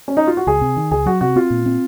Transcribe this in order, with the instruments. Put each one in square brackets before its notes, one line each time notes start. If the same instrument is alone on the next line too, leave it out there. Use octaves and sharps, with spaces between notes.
[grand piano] C#4
D#4
F4
F#4
[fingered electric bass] C#2 [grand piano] G#4
[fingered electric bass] C3
D#3
[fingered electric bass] C#2 [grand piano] G#4
[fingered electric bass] F#3 [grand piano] F#4
[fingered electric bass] C3 [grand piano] F#4
[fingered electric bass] C4 [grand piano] F4
[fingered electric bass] A#2
C4